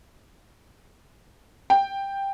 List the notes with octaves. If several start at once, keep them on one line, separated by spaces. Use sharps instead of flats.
G5